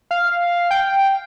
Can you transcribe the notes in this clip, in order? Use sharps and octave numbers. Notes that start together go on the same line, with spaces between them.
F5
F5
G5